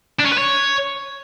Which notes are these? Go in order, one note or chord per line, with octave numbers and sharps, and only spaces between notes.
D4
C#4
B4
C#5